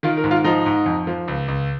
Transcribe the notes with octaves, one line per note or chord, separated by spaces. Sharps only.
D#3 F4
A#4
G#2
F4
F3 D#4
G#2
F2
F3
C#2
C#2